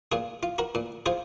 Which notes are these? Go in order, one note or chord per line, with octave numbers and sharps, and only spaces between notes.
A#2 F4 G#4
F4
F#4 A#4
A#2
F4 G#4 C5